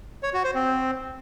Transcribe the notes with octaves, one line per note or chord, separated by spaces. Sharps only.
C#5
F#4
C5
C4